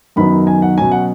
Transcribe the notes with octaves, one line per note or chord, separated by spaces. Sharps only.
F#2 D#3 F#3 B3 B5
G#5
F#5
B2 F#3 C#4 G#5
F#5